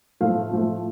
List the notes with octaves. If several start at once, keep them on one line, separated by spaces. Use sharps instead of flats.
A2 F3 A3 F5
A2 F3 A3